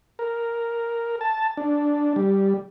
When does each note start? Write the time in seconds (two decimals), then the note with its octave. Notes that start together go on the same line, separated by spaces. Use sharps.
0.19 A#4
1.21 A5
1.57 D4
2.16 G3